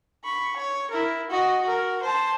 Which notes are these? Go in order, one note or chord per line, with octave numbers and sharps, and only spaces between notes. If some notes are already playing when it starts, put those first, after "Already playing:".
B5 C#6
C#5
E4 A#4
F#4 D#5
F#4 A#4
C5 A5